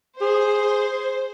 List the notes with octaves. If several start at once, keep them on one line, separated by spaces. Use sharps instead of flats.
G#4 C5